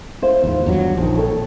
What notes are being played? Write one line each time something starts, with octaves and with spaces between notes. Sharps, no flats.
E4 C5 F5
D#2 G#2 E3 F4
E2 G2 F#3
A#1 D#3 F3
A4 C#5 G5